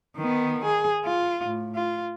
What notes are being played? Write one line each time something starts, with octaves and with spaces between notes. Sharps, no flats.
D#3 B3
G#4
F4
A2
F4